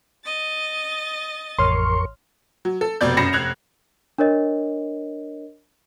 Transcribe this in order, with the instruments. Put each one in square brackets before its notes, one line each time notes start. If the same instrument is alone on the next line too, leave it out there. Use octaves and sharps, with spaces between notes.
[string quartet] D#5 A6
[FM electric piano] A1 C#5 F6 [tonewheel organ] F2 A#4 C#6 [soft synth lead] C6
[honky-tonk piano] F#3
A4
F1 B2 D5 G6
F#2 B5 A#6 C7 C#7 E7
F1 F#6 G#6 F7
[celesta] D4 A#4 C#5 D#5